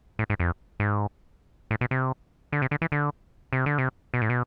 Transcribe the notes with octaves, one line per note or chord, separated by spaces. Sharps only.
A2
G#2
F2
G#2
A2
B2
C3
D3
C3
D3
E3
D3
C3
D3
C3
B2
A2
B2